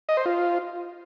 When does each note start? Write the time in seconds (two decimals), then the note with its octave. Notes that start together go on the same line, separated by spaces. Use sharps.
0.09 D#5
0.17 C5
0.26 F4